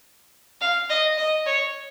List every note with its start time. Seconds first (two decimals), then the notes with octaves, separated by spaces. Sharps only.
0.61 F5
0.90 D#5
1.18 D#5
1.46 C#5